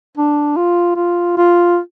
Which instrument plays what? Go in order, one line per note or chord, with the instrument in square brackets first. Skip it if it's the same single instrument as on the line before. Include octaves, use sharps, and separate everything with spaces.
[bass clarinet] D4
F4
F4
F4